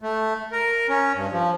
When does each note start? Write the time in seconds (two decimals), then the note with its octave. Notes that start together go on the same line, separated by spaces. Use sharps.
0.01 A3
0.52 A#4
0.89 C#4
1.14 G2
1.31 F3